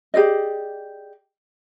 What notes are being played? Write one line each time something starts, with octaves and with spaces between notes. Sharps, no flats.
G4 G#4 D5 D#5